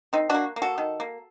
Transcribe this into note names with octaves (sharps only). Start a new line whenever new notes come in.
D#3 C4 D#4
A#3 D4 F#4
A#3
F#4 A4
D#3
A#3